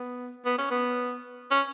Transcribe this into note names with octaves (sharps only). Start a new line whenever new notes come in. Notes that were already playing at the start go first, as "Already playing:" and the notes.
Already playing: B3
B3
C#4
B3
C#4